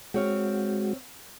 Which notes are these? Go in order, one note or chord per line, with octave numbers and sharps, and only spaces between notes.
G#3 C4 F#4 C#5 F5